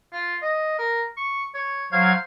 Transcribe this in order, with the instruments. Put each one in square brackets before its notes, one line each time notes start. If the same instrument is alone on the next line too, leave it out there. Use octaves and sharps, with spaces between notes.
[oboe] F4
D#5
A#4
C#6
C#5
[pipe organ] F#3 F5 G#6 [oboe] C5